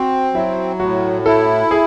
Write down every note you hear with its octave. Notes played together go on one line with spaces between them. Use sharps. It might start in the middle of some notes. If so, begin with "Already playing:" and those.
Already playing: C4 F#4
F#3 E4
A2 F#4
E4 A4
G#4